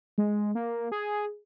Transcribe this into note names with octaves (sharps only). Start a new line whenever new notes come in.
G#3
A#3
G#4